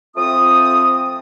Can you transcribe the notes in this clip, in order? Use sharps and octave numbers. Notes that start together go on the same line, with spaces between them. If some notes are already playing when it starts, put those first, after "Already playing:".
F3 A3 C4 F4 D#6